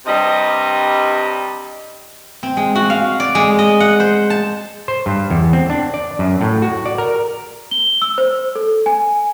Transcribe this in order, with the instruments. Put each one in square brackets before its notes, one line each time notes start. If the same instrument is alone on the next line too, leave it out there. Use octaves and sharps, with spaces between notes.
[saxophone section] G2 C3 G3 D#5
[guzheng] C4
G#3
F#4
F5
D5
G#3
D#5
F#5
C5
A5
[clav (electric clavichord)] C5
G2
E2
C4
D4
D5
F#2
A2
F#4
D5
A#4
[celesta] G7
E6
C5
A4
G#5